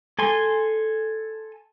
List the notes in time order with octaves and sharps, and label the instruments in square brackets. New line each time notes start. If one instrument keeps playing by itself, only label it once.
[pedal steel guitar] A4 G#5 C6